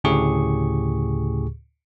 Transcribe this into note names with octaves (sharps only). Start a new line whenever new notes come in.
D2 A2 C#3 G4 G#4 C#6